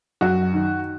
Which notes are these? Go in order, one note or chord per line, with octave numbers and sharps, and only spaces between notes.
F#2 F#4
D#3